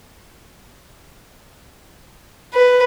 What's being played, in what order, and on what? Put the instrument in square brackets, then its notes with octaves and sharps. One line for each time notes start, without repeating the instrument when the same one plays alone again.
[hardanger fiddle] B4